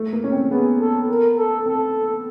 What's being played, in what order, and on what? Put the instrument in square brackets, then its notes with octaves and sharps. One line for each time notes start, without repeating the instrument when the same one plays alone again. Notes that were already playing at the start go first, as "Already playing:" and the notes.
Already playing: [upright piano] A3
A#3
C#4
C4
[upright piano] B3 [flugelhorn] G#4
[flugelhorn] A4
A#4
A4
[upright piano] C4 [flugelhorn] A4